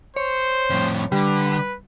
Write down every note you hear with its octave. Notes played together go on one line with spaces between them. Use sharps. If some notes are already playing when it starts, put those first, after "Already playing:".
C5 C#5
F2 A2
D3 G3 B4